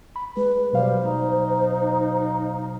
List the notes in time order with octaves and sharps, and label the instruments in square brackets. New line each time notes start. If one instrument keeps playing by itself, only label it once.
[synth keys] B5
[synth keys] G#3 [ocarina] B4
[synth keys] B2 F#3 F5 [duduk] G3 [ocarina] C5
[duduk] D#4